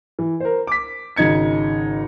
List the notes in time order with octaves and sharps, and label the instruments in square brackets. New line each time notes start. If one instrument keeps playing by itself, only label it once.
[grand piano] E3
A#4 C5
D6 B6
G#1 C#3 D#4 G#6 C#7